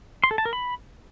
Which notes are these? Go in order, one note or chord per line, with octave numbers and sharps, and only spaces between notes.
C6
A4
A5
A#4
B5